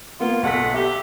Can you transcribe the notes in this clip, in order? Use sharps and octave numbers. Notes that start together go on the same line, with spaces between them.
A#3 B3 F4
B1 A4 F#5 B6
G4 E5